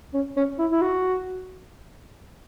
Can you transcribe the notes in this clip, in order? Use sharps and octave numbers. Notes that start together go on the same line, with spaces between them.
C#4
C#4
E4
E4
F#4